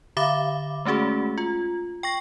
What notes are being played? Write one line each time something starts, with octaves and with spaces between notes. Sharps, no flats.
D3 E5 F5 B5 D6
G#3 A3 C#4 F#4 G#4
F4
G5 C#6 A#6